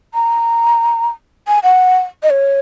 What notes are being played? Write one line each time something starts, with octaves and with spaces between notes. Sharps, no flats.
A#5
G#5
F#5
D#5
C#5